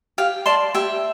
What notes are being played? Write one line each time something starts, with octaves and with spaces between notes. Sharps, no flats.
G4 F5
D5 A5 C6
G4 E5